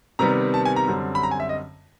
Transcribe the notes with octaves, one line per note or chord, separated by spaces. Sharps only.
C3 D#3 G3 B3 A#5
A5
G#5
A#5
F#2 D3 G3 C4
B5
A#5
G#5
E5
D#5